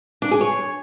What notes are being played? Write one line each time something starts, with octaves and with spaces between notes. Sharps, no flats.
D4
G#4
C#5